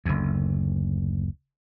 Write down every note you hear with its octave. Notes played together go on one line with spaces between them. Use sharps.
F#1 D2